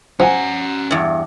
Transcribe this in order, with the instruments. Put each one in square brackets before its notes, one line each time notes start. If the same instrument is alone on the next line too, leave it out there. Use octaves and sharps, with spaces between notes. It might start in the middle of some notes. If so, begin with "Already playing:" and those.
[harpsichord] F3 [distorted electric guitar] C#4 A#5 [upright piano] F#5 G#5
[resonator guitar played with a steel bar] E2 G2